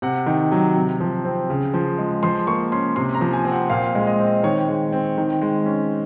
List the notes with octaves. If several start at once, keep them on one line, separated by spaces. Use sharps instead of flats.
C3 F#5
D#3
F#3
C3
F3
C4
C#3
F3
G#3
F3 C6
A#3 C#6
C#4 C6
C3 C6
A#5
F3
G#5
C4
F#5
A#2 F5
G#3
D#5
C4
D#3 C#5
G#3
C4
D#3
G#3
C#4